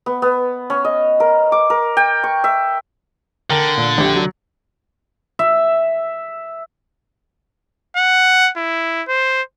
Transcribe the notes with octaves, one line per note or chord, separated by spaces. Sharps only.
B3
B3
C#4
D#5
A#4
D6
A#4
G5
C#6
E5
D3 A#4 G5
A#2
A#1 G4
F#3
E5
F#5
E4
C5